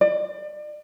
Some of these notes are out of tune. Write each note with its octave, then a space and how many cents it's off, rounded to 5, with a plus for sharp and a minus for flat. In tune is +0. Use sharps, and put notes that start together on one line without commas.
D5 +35